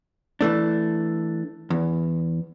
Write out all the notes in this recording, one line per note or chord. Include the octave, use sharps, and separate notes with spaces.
E3 A3 D4
E2